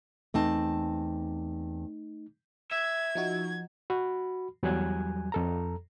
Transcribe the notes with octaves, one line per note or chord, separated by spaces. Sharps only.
E2 A3 C4 D#4 A5
E5 G#6
F3 D#4 F#4
F#4 B5
E2 F#3 G3 G#5 F#6 G#6
F2 A4 A#5